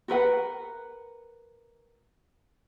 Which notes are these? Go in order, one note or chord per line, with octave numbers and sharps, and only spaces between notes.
F#4 A#4 B4 F#5